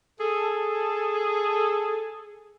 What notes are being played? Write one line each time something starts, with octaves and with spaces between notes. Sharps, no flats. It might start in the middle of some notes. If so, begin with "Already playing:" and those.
G#4 A4